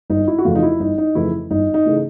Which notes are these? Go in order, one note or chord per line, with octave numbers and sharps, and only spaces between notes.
G1 D#4
E4
F#4
F2 C#3 E3 A3 F4
D#4
E4
G1 D#4
D#4
F2 C#3 E3 A3 E4
G1 D#4
D#4
C#3 E3 A3